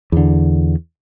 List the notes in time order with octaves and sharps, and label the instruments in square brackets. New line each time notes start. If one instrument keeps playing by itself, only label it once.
[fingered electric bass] E2 D3